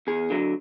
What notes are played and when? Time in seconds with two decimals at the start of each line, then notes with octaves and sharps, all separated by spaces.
0.07 E2 G#4
0.30 D3 F#3